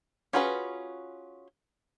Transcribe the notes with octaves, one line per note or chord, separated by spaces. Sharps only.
C#4 F4 F#4 G#4 B4